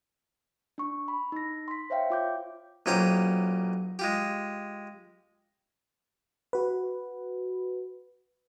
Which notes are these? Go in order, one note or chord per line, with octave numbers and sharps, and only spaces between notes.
D4 C#6
B5
D#4 A#6
C6 B6
C5 C#5 E5 F5 G5
F4 D6 G6
B1 A#2 C#4 G4 C5 D#6
G#3 F4 G4
F#4 B4